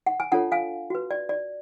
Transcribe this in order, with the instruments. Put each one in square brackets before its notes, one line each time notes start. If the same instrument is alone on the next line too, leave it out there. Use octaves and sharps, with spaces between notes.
[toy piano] F#5
G#5
D4 F4 A4 C#5 F#5 A5
F5 G#5
F#4 B4
D5
D5